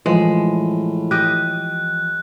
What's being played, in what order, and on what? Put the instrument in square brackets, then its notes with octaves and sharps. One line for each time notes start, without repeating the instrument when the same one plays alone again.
[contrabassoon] A2 [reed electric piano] E3 F3 [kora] G#3
[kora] G4 D#5 [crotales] F#6